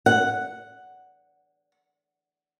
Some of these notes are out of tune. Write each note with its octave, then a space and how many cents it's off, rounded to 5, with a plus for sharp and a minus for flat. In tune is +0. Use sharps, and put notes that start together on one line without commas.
F#5 +0